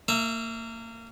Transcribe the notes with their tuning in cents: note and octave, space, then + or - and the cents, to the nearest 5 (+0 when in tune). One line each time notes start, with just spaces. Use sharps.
A#3 -30 E5 +0